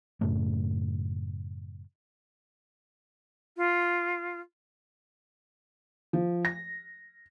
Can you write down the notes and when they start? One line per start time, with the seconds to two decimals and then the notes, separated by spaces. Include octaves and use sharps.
0.21 F#2 A2 C#3 A3
3.57 F4
6.13 F3
6.45 A#6